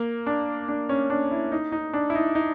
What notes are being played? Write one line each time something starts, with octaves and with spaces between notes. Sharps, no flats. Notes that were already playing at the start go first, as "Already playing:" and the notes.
Already playing: A#3
D4
D4
C#4
D4
E4
D#4
D#4
D4
E4
D#4
D#4